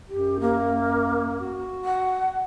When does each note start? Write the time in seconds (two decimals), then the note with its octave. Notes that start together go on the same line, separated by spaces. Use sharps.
0.09 F#2 G4
0.40 A#3
1.41 F#4
1.84 F#5